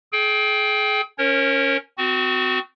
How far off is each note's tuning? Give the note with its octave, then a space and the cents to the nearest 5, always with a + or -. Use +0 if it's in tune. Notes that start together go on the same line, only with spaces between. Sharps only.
G#4 +35 G5 +0
C#4 +0 A#4 +0 C#5 -35
C4 -30 F#4 +0